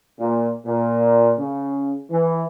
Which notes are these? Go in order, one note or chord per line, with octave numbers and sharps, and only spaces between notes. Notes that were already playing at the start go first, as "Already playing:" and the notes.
A#2
A#2
C#3
E3